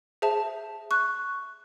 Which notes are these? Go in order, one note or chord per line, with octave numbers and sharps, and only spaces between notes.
G#4 C5 E5 A5
C#6 F#6